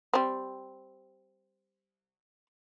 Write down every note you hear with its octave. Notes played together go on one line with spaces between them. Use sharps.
G3 C4